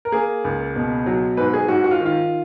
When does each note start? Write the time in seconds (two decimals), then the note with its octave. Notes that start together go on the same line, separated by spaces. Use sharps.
0.05 A#4
0.12 A#3 G#4
0.44 C#2
0.76 B2
1.06 F#3
1.37 G#2 B4
1.54 G#4
1.68 G#2 F#4
1.84 F#4
1.91 F4
2.00 D#3
2.06 F4